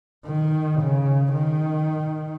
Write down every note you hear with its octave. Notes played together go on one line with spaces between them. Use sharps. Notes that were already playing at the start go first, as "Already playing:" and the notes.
D#3
C#3
D#3